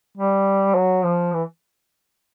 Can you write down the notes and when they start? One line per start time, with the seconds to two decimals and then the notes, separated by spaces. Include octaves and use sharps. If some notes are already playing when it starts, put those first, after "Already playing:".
0.17 G3
0.75 F#3
1.04 F3
1.33 E3